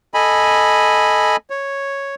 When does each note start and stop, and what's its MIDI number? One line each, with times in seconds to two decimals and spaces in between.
0.14 1.36 69
0.14 1.36 75
0.14 1.36 80
0.14 1.36 83
1.50 2.15 73